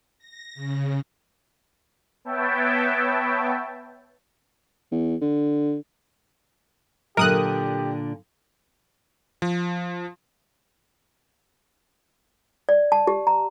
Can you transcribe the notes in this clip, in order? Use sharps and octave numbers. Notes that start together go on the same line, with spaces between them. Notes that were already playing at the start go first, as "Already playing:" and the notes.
A#6
C#3
B3 B4 C#5 E5 G5 A5
E2
D3
A#2 D3 F#3 G4 A#4 D#6 F#6
F3
D5
A5
G4
A#5